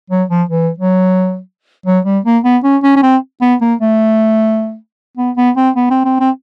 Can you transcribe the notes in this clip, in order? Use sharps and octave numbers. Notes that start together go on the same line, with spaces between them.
F#3
F3
E3
F#3
F#3
G3
A#3
B3
C#4
C#4
C#4
C4
B3
A#3
A3
B3
B3
C4
B3
C4
C4
C4